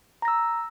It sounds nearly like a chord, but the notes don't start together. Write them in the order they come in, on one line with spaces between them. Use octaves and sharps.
A#5 A#6 E6